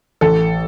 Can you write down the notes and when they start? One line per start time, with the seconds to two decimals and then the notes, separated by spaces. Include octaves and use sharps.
0.21 A1 A4